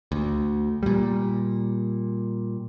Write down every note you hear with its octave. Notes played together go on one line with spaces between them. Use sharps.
D2
A#2 G3